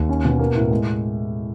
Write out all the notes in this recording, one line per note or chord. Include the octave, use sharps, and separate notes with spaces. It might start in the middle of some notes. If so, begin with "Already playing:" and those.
Already playing: D#2
C#4
B2
A#3
A2
G#3